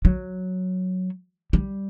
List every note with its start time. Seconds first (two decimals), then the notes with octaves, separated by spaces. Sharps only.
0.05 F#3
1.53 G3